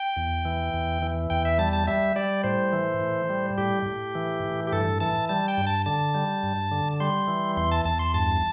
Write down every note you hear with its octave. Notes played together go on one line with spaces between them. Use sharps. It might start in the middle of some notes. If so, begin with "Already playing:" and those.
Already playing: G5
E2
E3
E2
E3
E2 G5
E5
G3 A5
A5
G3 E5
G3 D5
A2 C5
E3
A2
G3
A2 G4
A2
E3
A2
G4
G2 A4
E3 A5
G3 A5
G5
G2
A5
D3 A5
G3
G2
D3
G3 C6
E3
E2 C6
A5
E2 A5
C6
G2 A5